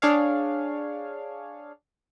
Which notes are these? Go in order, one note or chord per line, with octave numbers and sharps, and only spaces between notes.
D4 G#4 C#5 F5